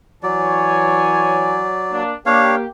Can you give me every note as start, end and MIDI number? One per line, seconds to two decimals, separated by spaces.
0.23 1.70 52
0.23 2.03 54
0.23 1.70 73
0.23 2.03 74
0.23 1.70 80
1.91 2.12 58
1.91 2.12 62
2.26 2.64 58
2.26 2.55 62
2.26 2.64 67
2.26 2.55 73
2.26 2.55 77